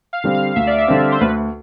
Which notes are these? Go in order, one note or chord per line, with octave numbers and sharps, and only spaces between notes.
F5
D3 G3 C4
F5
D2 E5
D5
E5
D3 G3 C4
C5
D2 B4